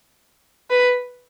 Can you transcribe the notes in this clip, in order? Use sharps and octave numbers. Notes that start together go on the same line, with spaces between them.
B4